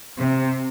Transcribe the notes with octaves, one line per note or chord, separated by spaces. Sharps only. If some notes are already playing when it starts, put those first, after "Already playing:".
C3